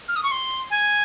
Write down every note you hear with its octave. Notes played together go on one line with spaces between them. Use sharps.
F6
D#6
C#6
C6
G#5